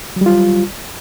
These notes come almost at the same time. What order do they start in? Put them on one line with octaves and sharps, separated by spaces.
F#3 G3 F4